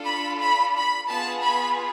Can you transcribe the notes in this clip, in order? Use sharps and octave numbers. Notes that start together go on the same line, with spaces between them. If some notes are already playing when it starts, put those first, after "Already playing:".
Already playing: D4 F4 A4
B5
B5
B5
B3 F4 G#4 A5
B5